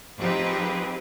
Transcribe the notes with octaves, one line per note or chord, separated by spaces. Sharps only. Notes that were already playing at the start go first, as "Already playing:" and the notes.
F3 C4 D#4 G4 G#4 B4